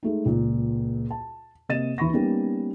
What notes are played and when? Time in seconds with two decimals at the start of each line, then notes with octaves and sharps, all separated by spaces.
0.03 G#3 A3 D#4
0.26 C#2 A#2
1.11 A5
1.69 C3 A#3 D#5 A6 D#7 E7
1.98 D#2 E3 B5 C#6 A#6
2.13 G3 A#3 B3 C#4 D#4